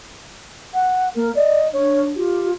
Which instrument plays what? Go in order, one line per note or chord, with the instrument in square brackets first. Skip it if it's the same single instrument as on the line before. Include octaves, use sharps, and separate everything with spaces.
[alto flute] F#5
[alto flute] A#3 [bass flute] A#4
[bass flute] D5 [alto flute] D#5
[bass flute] D4 [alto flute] C#5
[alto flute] F4 [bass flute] G4